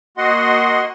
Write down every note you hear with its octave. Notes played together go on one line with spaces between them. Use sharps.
A#3 F#4 D#5 F#5 C6